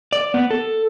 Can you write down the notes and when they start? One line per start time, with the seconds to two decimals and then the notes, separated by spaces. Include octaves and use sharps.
0.12 D5
0.34 B3
0.51 A4